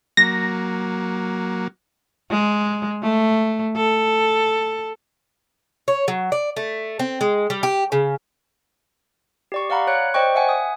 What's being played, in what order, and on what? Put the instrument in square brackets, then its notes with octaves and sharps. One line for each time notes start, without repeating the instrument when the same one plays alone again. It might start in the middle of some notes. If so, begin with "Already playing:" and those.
[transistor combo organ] F#3 A#3 [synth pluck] A#6
[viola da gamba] G#3
A3
A4
[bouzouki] C#5
F#3
D5
A3
C4
G#3
G3
G4
C#3
[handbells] G4 D5 C#6
D5 F5 F#5 A#5 B5
C#5 F#6 C#7
C5 D5 D#5 G5 C#6
E5 F#5 G#5
D#6